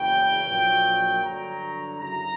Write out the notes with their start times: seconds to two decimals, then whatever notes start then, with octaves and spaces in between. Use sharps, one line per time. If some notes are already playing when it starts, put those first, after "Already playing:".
Already playing: F#1 E2 C#3 G5
0.45 A#1 A#2 F#3
1.22 G2 D3 F#3 A#5
2.00 F#2 C#3 F#3 C#4 E4 A#5